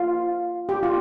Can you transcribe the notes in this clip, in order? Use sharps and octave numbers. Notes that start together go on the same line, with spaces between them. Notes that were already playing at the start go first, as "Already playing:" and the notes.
Already playing: F4
G4
F4